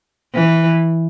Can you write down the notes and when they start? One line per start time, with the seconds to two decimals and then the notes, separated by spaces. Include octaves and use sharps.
0.34 E3